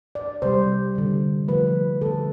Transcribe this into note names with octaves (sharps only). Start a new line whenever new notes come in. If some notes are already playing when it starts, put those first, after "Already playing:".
D5
C3 G3 C5
D3 G3
D3 F3 A3 B4
D3 A3 A4